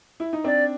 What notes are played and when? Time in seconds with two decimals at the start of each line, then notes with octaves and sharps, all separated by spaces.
0.20 E4
0.33 D#4
0.44 C4 D4 D5